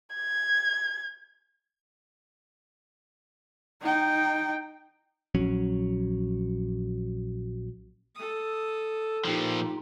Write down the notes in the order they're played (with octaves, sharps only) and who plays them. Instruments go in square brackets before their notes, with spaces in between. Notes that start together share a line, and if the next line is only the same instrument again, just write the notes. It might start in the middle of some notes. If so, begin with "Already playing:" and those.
[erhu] G#6
[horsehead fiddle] D#4 G5
[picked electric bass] A#1 F#3 C#4
[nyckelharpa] A4 D#6
[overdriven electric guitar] A#2 F3 [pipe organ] D#4 F4 [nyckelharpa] G4